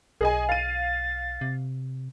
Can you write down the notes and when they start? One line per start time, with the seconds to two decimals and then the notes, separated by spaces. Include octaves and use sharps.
0.21 B1 G#4 D#5 G#5
0.49 F5 A6 D#7
1.41 C3